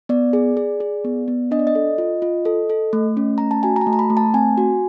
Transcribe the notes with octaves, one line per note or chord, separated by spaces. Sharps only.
B3 D5
G#4
G#4
G#4
B3
B3
D4 D#5
D5
D#5
A4
F4
F4
A4
A4
A3
C#4
A3 A#5
A5
F#4 G#5
A#5
A5
A3
A#5
B5
A3
A5
C4 G#5
F#4